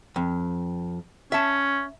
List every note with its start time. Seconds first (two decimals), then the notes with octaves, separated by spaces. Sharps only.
0.16 F2
1.32 C#4 E5 A5